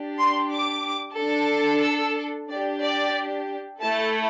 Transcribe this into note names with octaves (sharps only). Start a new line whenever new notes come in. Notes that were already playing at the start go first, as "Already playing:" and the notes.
Already playing: D4 G4
C6
D6
D4 A4
E6
D4 G4 D5
D5
A3 E4 A4 A5